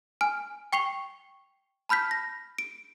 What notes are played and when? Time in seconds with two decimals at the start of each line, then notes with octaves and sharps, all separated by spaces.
0.21 G#5 F6 D7
0.73 G5 C#6 C7 F7 G7
1.89 A5 B5 F6 G6 B6
2.11 A#6
2.59 D7